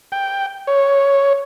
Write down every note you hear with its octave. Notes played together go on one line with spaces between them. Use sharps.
G5
C#5